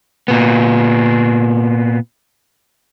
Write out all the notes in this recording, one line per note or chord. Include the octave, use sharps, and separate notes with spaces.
A#2 B3